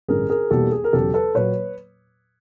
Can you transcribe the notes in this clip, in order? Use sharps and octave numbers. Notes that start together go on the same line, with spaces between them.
A1 G2 D3 G#4 A#4
G#4 A#4
E1 E2 B2 G3 A#3 G4 A4
G#4
A#4
E1 E2 C#3 F#3 G4 A4
A4 B4
A#2 F#3 A#3 B4 C#5